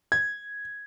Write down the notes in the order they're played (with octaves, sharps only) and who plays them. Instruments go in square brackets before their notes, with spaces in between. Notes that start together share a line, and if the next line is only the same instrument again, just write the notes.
[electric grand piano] G#6